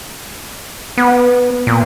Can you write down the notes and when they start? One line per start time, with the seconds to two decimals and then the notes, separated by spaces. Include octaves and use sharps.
0.97 B3
1.67 A#2